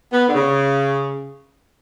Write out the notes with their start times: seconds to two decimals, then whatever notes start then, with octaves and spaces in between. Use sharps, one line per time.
0.13 B3
0.28 D3
0.34 C#3